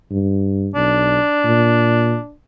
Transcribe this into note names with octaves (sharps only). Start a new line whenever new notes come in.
G2
B1 D4
A#2